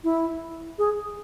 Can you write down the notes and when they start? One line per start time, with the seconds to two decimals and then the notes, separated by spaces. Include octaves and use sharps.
0.04 E4
0.78 G#4